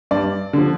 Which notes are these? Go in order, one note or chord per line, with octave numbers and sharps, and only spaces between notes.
G2 D5
D3 F3